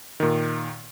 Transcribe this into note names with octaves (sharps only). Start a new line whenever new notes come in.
A#2 D#3